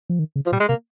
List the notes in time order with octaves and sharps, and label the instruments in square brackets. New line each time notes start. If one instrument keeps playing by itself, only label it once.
[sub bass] F3
D#3
C#3
[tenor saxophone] F3
[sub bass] A#2 [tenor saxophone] G3
[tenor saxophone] G#3
[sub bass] C3 [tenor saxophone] A#3